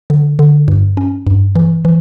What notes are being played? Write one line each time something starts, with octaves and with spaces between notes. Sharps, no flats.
D3
D3
G2
C#4
G2
E3
E3